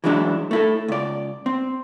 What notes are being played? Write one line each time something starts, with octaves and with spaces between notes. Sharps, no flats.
E3 F#3 G#3 D4 E4
A3 E4 A4
C#2 D5
C4